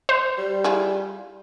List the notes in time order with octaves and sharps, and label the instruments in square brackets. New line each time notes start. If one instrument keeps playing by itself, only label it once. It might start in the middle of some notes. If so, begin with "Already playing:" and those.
[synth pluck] C5
[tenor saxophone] G3
[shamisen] E4 F4 G#4